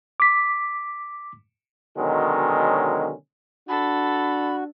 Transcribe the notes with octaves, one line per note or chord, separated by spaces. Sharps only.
D6 B6
B2 D3 D#3 F#3 G#3 C#4
D4 F#4 A4 B5